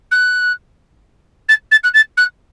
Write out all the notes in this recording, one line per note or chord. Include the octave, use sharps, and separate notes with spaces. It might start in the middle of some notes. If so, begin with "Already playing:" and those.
F#6
A6
A6
F#6
A6
F#6